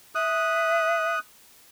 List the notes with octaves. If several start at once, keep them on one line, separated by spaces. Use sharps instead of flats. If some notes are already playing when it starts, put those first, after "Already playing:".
E5 D#6 F#6